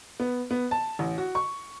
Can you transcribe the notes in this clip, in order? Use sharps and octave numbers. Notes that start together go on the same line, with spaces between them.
B3
B3
A5
A1
F#4
C#6